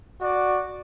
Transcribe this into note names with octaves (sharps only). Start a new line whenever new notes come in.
F#4 D5